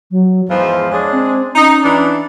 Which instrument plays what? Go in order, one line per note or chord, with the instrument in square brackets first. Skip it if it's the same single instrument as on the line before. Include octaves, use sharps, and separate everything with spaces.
[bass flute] F#3
[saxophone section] E2 G#2 F3 [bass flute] F5
[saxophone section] G#3 D4 G#4 [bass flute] C#5
[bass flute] C4
[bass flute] C#4 [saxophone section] D#4
[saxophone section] E3 D4